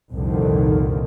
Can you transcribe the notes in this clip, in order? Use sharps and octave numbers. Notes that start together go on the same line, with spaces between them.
C2 F2 A#2 D3 D#3